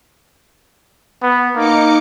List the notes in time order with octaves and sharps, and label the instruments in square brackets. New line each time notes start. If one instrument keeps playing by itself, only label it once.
[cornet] B3
[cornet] A#3 [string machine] D#4 D6 C#7